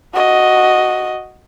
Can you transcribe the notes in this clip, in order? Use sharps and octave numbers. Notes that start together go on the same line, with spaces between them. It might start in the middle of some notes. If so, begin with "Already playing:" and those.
F#4 D#5